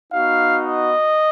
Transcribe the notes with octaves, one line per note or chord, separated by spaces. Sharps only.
B3 D#4 F#4 F5
D#5